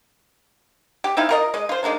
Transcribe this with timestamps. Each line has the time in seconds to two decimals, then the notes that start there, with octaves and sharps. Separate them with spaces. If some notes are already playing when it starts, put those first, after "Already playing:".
1.04 G4
1.17 C4 D#4 E4 F5
1.29 F4 A#4 D#5
1.54 G#3 D#5
1.69 F4 C5
1.83 D#3 G#3 A#3 D4